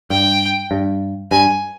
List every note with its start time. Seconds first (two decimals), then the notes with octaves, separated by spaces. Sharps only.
0.10 G2 G5
0.71 G2
1.31 G2 G#5